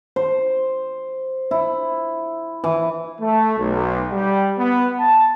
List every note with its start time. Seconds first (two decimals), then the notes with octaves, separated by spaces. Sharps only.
0.16 C5
1.51 E4
2.64 E3
3.21 A3
3.58 B1
4.12 G3
4.58 B3
5.00 A5